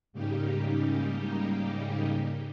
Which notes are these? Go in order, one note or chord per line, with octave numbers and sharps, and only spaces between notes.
G#2 C#3 G3 A#3 D#4 G4